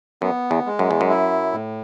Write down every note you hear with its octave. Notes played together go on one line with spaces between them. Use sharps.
F#2 B3
E2
G#3
F#2
E2
F#2
E4
A2